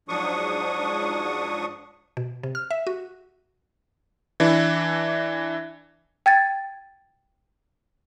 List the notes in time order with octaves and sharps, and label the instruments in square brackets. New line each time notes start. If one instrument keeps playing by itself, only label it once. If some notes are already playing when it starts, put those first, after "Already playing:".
[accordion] G#2 F3 F#3 D4 C#6 D#6
[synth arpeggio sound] B2
C3
F6
E5
F#4
[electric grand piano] E3 D4 E4
[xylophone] G5 G#6 A6